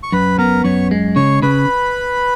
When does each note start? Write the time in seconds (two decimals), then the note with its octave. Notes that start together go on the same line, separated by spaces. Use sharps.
0.03 C#6
0.12 F#2 B4 B5
0.38 B3 A#4 A#5
0.64 F#2 C#5 C#6
0.91 G#3
1.16 C#3 C#5 C#6
1.42 C#3 B4 B5